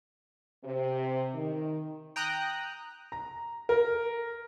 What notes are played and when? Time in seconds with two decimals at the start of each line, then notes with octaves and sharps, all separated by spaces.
0.64 C3
1.35 D#3
2.16 G5 A#5 D#6 F#6
3.12 A#5
3.69 A#4